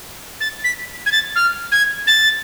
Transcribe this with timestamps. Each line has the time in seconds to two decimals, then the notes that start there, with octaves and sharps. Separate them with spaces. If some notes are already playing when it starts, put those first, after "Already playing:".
0.41 A6
0.64 B6
1.06 G#6
1.12 A6
1.36 F6
1.72 G#6
2.07 A6